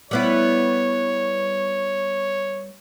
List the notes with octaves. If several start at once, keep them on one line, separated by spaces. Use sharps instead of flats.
G3 B3 E4 C#5